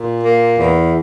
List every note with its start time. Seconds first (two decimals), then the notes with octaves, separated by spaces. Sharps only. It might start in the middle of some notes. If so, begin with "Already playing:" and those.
Already playing: A#2
0.24 A#3
0.58 E2